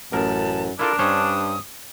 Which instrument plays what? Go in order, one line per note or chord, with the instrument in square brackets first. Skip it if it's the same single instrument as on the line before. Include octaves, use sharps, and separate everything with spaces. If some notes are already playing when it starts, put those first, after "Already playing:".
[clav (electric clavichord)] A1 A#4 [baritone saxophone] F#2 [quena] A5
[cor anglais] D4 [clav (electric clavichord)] E4 F4 A4 [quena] A#4
[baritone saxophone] G2 [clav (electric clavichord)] C#4 C5 C#5 [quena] D#6